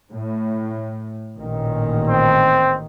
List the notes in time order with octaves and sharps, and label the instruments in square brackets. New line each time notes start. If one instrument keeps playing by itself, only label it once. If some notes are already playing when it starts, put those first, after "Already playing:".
[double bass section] A2
A1 A#2 D#3
[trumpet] C4